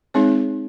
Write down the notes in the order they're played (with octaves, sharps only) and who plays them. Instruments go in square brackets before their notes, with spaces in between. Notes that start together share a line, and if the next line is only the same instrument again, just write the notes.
[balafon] G#3 C4 D#4 G#4 C#5